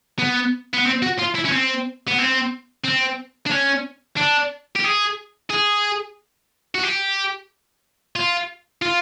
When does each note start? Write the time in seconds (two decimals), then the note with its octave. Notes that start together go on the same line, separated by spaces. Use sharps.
0.19 B3
0.73 B3
0.86 C4
1.02 F#4
1.19 F4
1.35 E4
1.45 C#4
1.52 C4
2.08 B3
2.18 C4
2.84 C4
3.46 D4
3.51 C#4
4.17 D4
4.76 G4
4.84 G#4
5.50 G#4
6.75 F#4
6.83 G4
8.16 F4
8.82 F4